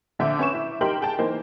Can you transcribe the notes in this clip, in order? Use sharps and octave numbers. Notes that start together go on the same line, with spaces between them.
A#1 D3 E5 D6 G6
C#4 B4 C#6 E7
E4 E5
D#4 G4 A#4 G5 C6 F#7
G#4 G5 A5
E3 A#3 D#4 C5